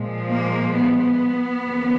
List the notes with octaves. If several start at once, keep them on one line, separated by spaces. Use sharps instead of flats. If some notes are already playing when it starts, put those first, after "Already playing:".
Already playing: A#2 F3 G#3
A#3
B3
D#2 C#3 F3 A#3